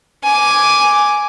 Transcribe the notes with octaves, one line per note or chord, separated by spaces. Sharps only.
G#5 D6